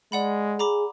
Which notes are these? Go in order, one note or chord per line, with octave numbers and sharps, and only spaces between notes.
G#3 D5 F#5 B5
G#4 A#5 B5 D6